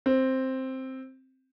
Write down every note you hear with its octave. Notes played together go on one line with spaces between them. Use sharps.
C4